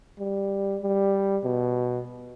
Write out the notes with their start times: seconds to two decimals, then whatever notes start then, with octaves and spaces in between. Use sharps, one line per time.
0.19 G3
0.81 G3
1.44 B2